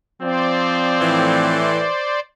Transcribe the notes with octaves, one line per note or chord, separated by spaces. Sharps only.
F3 C4 C5 D5
A2 E3